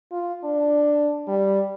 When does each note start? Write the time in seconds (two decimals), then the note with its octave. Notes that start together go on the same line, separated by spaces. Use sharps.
0.12 F4
0.44 D4
1.28 G3